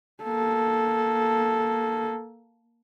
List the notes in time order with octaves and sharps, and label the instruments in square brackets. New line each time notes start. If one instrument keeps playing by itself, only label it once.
[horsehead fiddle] A#3 A4